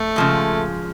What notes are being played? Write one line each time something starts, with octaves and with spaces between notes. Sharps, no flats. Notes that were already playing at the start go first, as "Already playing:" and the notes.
Already playing: A3
C#3 F3 G#3